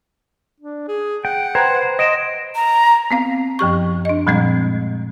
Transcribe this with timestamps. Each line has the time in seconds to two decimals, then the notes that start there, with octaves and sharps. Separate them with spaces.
0.60 D4
0.88 G#4
1.25 F#5 G5
1.55 B4 C5 G5 A#5 G#6
1.99 D#5 A#6 D7 E7
2.55 A#5
3.11 B3 C4 F5
3.59 F#2 F3 G4 C#6
4.05 D4 D#5
4.27 A#2 F3 G3 G#3 C4